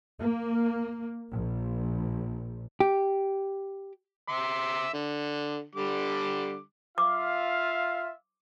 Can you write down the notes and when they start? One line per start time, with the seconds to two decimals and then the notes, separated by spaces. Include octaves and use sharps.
0.22 A#3
1.32 A#1
2.80 G4
4.28 E5 C6 D6
4.94 D3
5.75 D3 G3 D6
6.98 F4 E5 F5 D6